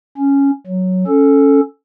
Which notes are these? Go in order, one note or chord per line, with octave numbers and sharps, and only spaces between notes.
C#4
F#3
C#4 A4